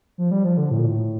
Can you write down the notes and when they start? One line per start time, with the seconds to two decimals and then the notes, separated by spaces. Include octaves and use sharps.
0.18 F3
0.31 G3
0.45 F3
0.58 D3
0.71 A2
0.78 A#2
0.86 A2